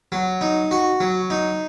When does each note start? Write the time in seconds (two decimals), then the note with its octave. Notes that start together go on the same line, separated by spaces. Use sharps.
0.12 F#3
0.41 D#4
0.71 F#4
1.00 F#3
1.30 D#4